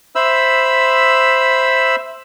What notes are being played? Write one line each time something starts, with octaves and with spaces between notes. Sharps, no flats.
C5 E5 B5 E6